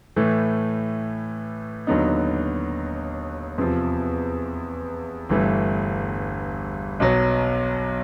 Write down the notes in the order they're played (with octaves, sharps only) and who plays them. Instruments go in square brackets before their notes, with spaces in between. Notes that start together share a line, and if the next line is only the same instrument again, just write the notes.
[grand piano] A2 E3 A3
D#2 D3 F#3 B3 D#4
E2 C3 F3
G1 G2 E3 A3
B1 B2 F#3